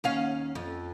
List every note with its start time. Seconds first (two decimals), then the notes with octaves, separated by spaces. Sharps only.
0.04 D#2 C#4 F5
0.55 F2